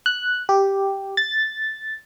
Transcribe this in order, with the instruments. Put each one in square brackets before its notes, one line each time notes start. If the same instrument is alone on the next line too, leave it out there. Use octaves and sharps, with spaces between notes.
[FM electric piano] F#6
G4
A6